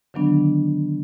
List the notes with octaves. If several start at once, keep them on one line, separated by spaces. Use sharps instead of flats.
D3 D#3 F#3 B3 D4